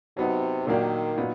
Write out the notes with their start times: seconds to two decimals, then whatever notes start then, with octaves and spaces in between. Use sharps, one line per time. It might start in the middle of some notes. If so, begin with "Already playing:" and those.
0.17 C3 F#3 B3 D#4
0.67 A#2 D#3 F#3 A#3 D4 G4
1.18 A#2 F#3 B3 D#4